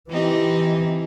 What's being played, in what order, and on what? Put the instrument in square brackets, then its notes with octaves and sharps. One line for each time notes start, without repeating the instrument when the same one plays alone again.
[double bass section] E3 [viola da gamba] C4 D#4 G4